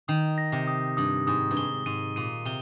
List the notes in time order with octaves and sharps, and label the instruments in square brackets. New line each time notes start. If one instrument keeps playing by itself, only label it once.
[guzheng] D#3 [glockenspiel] D#6
[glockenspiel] A#6
[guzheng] C3
[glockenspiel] D#6
[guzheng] G2 [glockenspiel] D#6
[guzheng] G#2 [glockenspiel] D#6
[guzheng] G2
[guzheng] G#2 [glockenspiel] G7
[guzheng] G#2 [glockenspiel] D#7
[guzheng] A#2 [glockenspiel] D#7
[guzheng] C3 [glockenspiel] G7